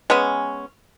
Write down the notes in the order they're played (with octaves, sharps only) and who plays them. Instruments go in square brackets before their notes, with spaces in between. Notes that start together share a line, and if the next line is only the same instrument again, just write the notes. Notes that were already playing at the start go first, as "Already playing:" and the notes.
[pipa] G#3 B3 C#4